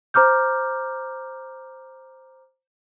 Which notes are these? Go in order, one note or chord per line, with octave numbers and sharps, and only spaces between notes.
C5 A#5 D6 F6 G6